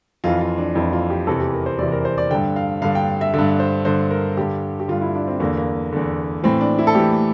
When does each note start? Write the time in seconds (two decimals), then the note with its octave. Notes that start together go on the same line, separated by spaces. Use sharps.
0.24 F2 E3 F4
0.41 F4
0.58 D4
0.75 F2 E3 E4
0.93 F4
1.10 G4
1.27 E2 C3 E3 A4
1.40 G4
1.54 A#4
1.66 C5
1.78 E2 C3 E3 D5
1.92 A#4
2.05 C5
2.18 D5
2.31 G2 D3 G5
2.56 F5
2.82 G2 D3 F5
2.95 G5
3.21 E5
3.34 G2 D3 E5
3.60 C5
3.85 G2 D3 C5
4.11 A#4
4.37 G2 D3 G4
4.79 G4
4.88 G2 D3 F4
5.01 E4
5.15 D4
5.27 C4
5.40 E2 D3 A#3
5.57 A#3
5.92 E2 D3
6.43 A2 E3 C4
6.61 D4
6.78 E4
6.87 A4
6.95 A2 E3 G4